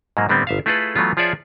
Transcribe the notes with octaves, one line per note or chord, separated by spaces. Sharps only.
G#2 F#3 A#3
A2 D3 G3 B3 C4
G1 E5 F5
A3 E4 F4 G#4 A4 B4
E3 F#3 A3 B3 F4
F3 F4 G#4 C#5 D5 E5